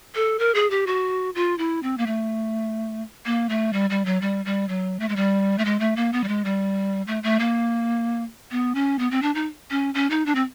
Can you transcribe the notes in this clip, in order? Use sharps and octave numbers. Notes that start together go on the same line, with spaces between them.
A4
A#4
G#4
G4
F#4
F4
E4
C4
A#3
A3
A#3
A3
G3
G3
F#3
G3
G3
F#3
A3
G#3
G3
A3
G#3
A3
A#3
B3
G3
G#3
G3
A3
A3
A#3
B3
C#4
B3
C4
D4
D#4
C#4
C#4
D#4
D4
C4